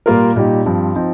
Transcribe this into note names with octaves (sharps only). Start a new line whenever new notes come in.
A#2 G3 A#3 F4 A#4
A#2 G3 D#4 G4
G2 F3 C4
F3 C4 D#4